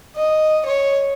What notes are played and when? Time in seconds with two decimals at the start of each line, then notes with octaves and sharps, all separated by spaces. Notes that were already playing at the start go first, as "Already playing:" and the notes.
0.16 D#5
0.66 C#5